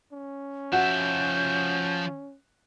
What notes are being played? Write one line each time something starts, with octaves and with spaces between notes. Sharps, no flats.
C#4
F3 F#4 E5 G6